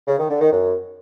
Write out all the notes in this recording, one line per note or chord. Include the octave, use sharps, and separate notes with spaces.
C#3
D#3
D3
D#3
F#2